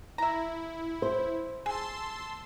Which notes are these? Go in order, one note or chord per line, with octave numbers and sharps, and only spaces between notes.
E4 E5 A#5
C5
G#4 A5 C6 E6